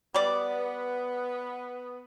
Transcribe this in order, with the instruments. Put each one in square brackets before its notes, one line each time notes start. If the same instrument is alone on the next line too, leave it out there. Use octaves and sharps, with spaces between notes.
[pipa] G3 D5 [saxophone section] B3